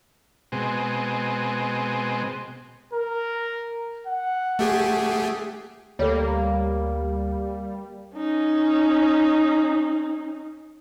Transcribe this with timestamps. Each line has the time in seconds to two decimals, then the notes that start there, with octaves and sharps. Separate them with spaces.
0.52 B2 G#3 C4
2.93 A#4
4.06 F#5
4.59 A3 G4 G#4
5.99 D2 G3 A#3 A4 C#5
8.17 C#4 D#4